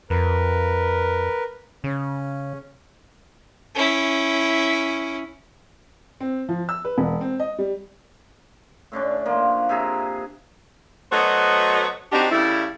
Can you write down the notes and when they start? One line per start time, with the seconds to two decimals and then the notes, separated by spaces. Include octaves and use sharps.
0.10 F2 A#4 B4
1.84 C#3 C#4
3.75 C#4 E4
6.20 C4
6.49 F3
6.69 E6
6.85 B4
6.98 E1
7.21 C4
7.40 D#5
7.58 G3
8.92 A2 D3 C#4 D4
9.26 F3 A#3
9.69 C3 E4 G#4 A#5
11.11 F#3 A3 B3 F#4 C5 D#5
12.12 C4 D4 D#4 F#4 G4
12.31 C#3 G3 A3 E4